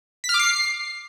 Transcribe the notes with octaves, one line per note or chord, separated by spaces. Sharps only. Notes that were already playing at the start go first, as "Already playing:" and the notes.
B6
F6
D6
C7